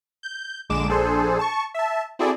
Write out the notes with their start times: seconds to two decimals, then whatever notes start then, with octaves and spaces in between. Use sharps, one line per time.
0.23 G6
0.70 A#1 D3 G#3 D6 E7
0.88 A#1 D4 G#4 A4 C5
1.39 A5 C#6
1.74 E5 A5
2.19 C4 E4 F#4 G#4 A4 D5